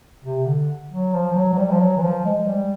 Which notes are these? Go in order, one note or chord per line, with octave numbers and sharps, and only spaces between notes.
C3
D3
F#3
F3
F3
F#3
F#3
G3
F3
F#3
E3
F3
G#3
G3